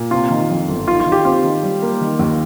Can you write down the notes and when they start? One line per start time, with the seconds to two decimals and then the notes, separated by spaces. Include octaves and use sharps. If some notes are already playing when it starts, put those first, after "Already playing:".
Already playing: A#2
0.11 C3 F4
0.31 D#3
0.49 F2
0.68 G1
0.87 D#4 F4
1.00 F4
1.06 D#3
1.12 G4
1.25 C4 F4
1.44 D#3
1.63 G3
1.82 A#3
2.01 D#3
2.19 D#2